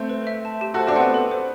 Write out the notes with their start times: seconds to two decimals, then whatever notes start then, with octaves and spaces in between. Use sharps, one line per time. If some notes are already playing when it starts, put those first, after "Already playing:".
Already playing: A3 C4 G6
0.09 B4
0.27 E5
0.45 A5
0.61 G4
0.74 F#4 A4 C5
0.87 D4 F#4
0.95 B3 C4 F#5
1.14 A4
1.31 C5